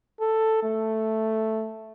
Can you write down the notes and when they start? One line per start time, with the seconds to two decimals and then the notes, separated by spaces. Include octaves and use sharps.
0.20 A4
0.64 A3